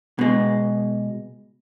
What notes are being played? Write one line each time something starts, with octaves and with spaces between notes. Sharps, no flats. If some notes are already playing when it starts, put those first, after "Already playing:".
B2 G#3